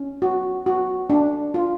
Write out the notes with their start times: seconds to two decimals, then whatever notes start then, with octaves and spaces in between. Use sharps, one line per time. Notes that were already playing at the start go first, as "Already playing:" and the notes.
Already playing: C#4
0.22 F#4
0.66 F#4
1.10 D4
1.54 F4